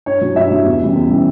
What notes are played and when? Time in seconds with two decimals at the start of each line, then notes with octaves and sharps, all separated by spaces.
0.06 G2 C#5
0.21 F#3
0.36 G2 E5
0.51 F#3
0.66 E2
0.81 C#3 E3 G3
0.96 E2
1.10 C#3 E3 G3